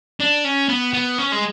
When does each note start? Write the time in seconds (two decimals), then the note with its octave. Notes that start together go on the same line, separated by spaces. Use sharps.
0.20 D4
0.45 C#4
0.69 B3
0.94 B3
1.18 C#4
1.32 G#3